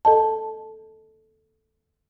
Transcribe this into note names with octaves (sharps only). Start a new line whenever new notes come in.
A4 D#5 A5